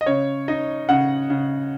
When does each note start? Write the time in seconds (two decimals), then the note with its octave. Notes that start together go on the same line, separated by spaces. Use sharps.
0.01 D#5
0.06 C#3 C#5
0.48 D#4 D#5
0.89 C#3 F#5
1.30 C#3